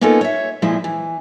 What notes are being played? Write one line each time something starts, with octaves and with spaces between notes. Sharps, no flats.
A#3 B3 C#4 D#4 F4 A4
C#5 E5
A#2 F3 G#3 E4
E3